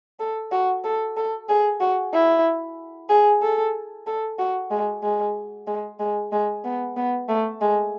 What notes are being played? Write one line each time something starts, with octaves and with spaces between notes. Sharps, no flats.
A4
F#4
A4
A4
G#4
F#4
E4
G#4
A4
A4
F#4
G#3
G#3
G#3
G#3
G#3
B3
B3
A3
G#3